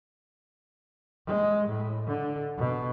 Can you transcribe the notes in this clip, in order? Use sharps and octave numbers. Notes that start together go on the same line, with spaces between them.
G#3
A2
D3
B2